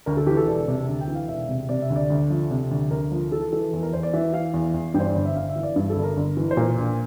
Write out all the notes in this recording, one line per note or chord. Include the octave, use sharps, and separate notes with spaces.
D2 A#4
A4
E3 G4
A4
E1
C3
D2
G5
E3
F5
E1 E5
C3
C3 D5
E5
D2
D5
D2
F3
C3
D2
D2 A#4
F3
E3 A4
E3 A4
E2
A#4
E2 C5
D5
E3 E5
E3 F5
E2
E2
G2 G5
C5
D5
G1 C5
E5
G1 F5
E5
E3
D5
G2
A4
G1
A#4
G1
E3
C5
A#2 A#4
A#1